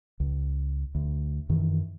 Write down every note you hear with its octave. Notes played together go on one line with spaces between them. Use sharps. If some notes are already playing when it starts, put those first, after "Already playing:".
C#2
D2
F#2 D#3 E3